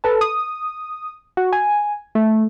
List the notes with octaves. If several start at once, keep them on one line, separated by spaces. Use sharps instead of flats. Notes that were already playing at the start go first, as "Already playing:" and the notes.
A4 B4 A5
D#6
F#4
G#5
A3